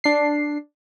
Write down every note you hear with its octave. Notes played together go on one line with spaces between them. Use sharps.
D4 C7